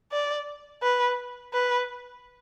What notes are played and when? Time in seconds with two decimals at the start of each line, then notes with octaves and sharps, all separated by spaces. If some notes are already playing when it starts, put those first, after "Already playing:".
0.12 D5
0.82 B4
1.53 B4